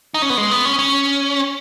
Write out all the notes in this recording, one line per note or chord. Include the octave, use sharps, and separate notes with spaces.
D#4
C#4
B3
G#3
B3
C#4
C#4